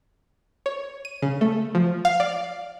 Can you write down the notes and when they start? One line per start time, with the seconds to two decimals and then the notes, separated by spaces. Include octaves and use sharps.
0.66 C#5
1.05 D#7
1.22 C#3
1.41 A3
1.75 F3
2.05 F5
2.20 D5